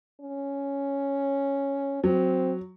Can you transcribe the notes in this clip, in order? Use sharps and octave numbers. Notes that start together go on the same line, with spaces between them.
C#4
F#3 C4